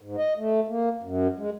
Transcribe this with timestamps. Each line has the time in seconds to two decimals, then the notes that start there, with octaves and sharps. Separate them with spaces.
0.01 G#2
0.18 D#5
0.37 A3
0.68 A#3
1.03 F#2
1.38 G#3